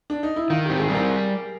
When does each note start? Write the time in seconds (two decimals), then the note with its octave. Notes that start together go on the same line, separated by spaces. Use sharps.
0.10 D4
0.23 D#4
0.36 E4
0.50 D#3 F4
0.65 G4
0.70 C4
0.79 G#4
0.89 G3
0.95 A#4